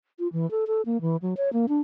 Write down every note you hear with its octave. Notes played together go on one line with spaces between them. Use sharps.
F4
E3
A4
A4
A#3
E3
F#3
C#5
A#3
D4